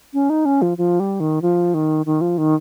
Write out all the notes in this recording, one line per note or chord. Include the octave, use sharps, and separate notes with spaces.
C#4
D#4
C#4
F3
F3
G3
D#3
F3
D#3
D#3
F3
D#3